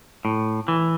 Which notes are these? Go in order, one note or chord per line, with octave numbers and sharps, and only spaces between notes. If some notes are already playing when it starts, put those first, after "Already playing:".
A2
E3